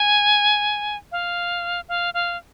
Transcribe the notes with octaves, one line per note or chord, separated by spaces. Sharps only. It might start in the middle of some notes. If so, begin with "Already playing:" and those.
Already playing: G#5
F5
F5
F5